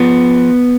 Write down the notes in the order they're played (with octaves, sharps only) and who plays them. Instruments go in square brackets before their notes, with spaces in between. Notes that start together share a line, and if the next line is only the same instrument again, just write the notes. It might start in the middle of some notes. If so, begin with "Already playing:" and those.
Already playing: [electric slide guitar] F3 B3